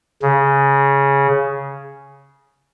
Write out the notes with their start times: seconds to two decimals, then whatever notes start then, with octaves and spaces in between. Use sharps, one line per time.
0.22 C#3